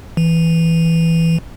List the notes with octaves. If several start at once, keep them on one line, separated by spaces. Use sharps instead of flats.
E3